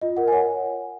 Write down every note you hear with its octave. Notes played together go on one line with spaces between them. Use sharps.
F4 D#5
A#4 F#5
G#5
C#5 F#5